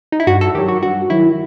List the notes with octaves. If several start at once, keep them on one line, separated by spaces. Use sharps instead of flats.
D#4
E4
G2 F#4
A4
D#3 F#3 G4
F#4
G2 F#4
D#3 F#3 E4